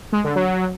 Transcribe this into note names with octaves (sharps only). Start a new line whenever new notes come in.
G#3
D3
F#3